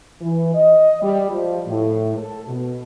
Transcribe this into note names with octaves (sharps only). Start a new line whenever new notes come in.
E3
D#5
G3
F3
A2
A4
B2